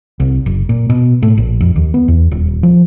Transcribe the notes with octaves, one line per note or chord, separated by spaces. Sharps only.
C2
F#1
A#2
B2
A2
A#1
F2
D#2
B3
E2
D#1
F3